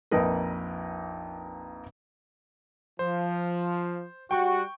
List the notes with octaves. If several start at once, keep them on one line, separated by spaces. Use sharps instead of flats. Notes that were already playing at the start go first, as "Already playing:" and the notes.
A#1 F2 D#4 A#4 B4
F3 C5
G3 F#4 G5 C#6